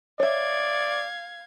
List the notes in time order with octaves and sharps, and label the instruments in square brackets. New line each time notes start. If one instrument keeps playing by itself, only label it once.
[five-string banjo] C#5 E5 [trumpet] D5 [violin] F5 G#6